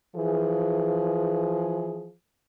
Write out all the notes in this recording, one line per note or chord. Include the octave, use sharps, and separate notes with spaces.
E3 F3 G#4